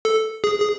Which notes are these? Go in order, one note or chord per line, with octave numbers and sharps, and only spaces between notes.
A4
G#4
G#4